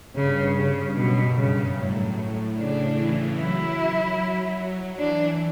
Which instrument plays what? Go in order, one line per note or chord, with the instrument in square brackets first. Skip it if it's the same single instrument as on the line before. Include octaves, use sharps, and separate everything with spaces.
[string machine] G2 [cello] C#3
[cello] C#3
[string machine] F#2 [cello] B2
[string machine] G2 [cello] C#3
[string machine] A2 [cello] F#3
[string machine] C#3 [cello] D4
[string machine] E3
[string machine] F#3 [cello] E4
[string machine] F#3
[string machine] E3 [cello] D4